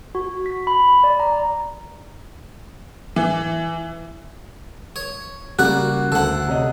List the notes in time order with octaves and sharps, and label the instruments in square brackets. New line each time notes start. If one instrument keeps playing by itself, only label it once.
[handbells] F#4
B6
B5
D5
A#5
[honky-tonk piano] E3
[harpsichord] C#5
[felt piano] C#3 G3 A#3 [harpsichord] F#4 D5 [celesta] F#6
[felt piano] D2 [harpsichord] A4 F#5
[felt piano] C3 C#5 D#5